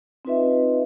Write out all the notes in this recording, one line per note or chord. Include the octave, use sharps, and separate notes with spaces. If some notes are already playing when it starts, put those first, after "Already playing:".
C4 D#4 F4 B4 D#5 E5